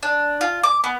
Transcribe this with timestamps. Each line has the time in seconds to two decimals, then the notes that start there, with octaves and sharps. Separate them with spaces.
0.03 D4
0.41 F4
0.63 D6
0.84 B3